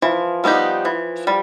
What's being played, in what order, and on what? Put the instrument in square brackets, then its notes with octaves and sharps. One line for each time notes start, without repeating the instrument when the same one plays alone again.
[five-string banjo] E3 [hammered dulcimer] F3
[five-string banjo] G3 B3 D#4 G4
E3
G3